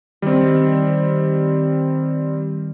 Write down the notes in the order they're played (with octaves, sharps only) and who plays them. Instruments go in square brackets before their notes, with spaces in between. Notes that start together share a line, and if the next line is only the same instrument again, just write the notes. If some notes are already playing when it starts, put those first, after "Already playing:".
[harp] D#3 [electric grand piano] G3 C4